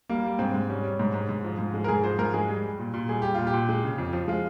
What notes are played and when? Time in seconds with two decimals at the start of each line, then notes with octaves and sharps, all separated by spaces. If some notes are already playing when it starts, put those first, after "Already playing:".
0.09 G3 A#3
0.25 G3
0.39 G#2 C4
0.54 G#2
0.70 G3 C#4
0.84 G3
0.99 G#2
1.14 G#2
1.29 G#2
1.44 F3
1.59 G#2
1.74 G#3
1.84 A#4
1.88 G#2 G#4
2.04 F3 C5
2.18 G#2 A#4
2.33 G#3 G#4
2.49 G3
2.64 G3
2.79 A#2
2.94 A#2
3.08 G3 G#4
3.22 G3 G4
3.34 A#2 F4
3.47 G4
3.53 A#2
3.69 G#3
3.84 C#3
3.98 F2
4.13 F3
4.28 G#3 F4